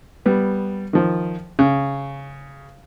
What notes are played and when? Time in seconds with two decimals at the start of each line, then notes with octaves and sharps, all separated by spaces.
0.26 G3 B3
0.93 D#3 F3
1.59 C#3